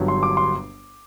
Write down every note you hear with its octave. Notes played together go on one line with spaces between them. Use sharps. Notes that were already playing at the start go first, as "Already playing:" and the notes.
Already playing: G1 G2 F#3
C6
D6
C6